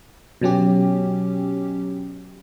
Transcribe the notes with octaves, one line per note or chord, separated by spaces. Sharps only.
B2 F#3 C#4 G4